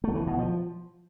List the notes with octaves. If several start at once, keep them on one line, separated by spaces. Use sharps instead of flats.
A3
E3
B2
F3